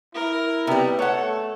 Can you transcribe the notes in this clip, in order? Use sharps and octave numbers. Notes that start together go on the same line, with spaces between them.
E4 A#4
C3 G3 B3
A3 A4 C#5 F#5